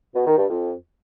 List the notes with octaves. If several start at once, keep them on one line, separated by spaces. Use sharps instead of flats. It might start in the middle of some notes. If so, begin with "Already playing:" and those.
B2
D#3
G2
F2